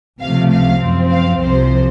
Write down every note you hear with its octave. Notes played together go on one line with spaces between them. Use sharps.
C#2 C3 F3 A3 F5
F5
F#2 F3 C4
F5
C2 C3 F3 C5